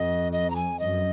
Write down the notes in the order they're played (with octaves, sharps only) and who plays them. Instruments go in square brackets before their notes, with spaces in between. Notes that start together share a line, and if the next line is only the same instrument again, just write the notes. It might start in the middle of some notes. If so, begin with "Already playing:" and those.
Already playing: [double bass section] F2 [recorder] D#5
[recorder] D#5
A#5
G#5
[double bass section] F#2 [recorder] D#5